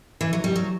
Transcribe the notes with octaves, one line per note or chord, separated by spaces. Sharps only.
E3
F#3
G3
F#3